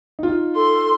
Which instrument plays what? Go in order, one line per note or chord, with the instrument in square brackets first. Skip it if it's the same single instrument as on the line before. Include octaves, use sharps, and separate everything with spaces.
[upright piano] D#4 F4
[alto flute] A4 [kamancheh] C6